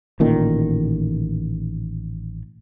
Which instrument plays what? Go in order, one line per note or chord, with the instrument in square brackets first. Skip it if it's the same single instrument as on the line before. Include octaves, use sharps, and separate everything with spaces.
[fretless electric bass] A1 A#2 D#3